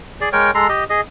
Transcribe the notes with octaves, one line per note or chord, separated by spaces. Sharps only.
G#4 D5
G#3 A#4 C#5 G5
G#3 A4 A#5 C6
G4 D#5
G#4 D#5